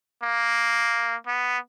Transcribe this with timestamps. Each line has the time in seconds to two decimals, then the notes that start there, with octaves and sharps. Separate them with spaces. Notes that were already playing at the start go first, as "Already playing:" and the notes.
0.23 A#3
1.27 B3